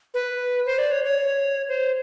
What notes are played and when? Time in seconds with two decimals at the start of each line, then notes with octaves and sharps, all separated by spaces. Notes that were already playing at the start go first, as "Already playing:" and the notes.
0.14 B4
0.66 C5
0.78 D5
0.92 C#5
1.04 C#5
1.69 C5